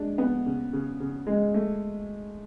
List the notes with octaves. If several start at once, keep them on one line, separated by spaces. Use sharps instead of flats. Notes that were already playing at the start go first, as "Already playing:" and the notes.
Already playing: G#3 D4
B3
C#3
C#3
C#3
G#3
A3